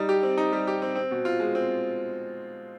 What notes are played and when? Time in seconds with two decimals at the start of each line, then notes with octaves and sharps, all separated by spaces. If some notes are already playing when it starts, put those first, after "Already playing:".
Already playing: G3 D#4
0.09 G4
0.23 C4
0.38 D#4
0.53 G3
0.67 G4
0.82 C4
0.96 C4
1.11 B2
1.25 F4
1.40 G#3
1.55 C4